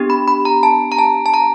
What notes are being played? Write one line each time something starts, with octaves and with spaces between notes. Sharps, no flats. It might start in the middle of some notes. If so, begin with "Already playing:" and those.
Already playing: B3 D4 G4
B5
B5
A#5
A5
A#5
A5
A5
A#5